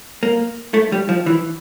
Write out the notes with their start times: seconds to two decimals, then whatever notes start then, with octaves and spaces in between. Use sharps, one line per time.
0.23 A#3
0.74 A3
0.92 G3
1.09 F3
1.26 E3